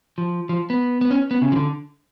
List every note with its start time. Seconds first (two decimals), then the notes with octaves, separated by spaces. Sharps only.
0.18 F3
0.49 F3
0.70 B3
1.01 B3
1.11 C#4
1.31 B3
1.42 C#3
1.52 F3
1.56 D3